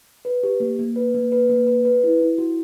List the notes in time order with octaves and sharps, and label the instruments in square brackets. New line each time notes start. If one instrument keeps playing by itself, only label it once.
[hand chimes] B4
G4
A#3
A#3
B4
A#3
B4
A#3
B4
B4
E4
E4
F#4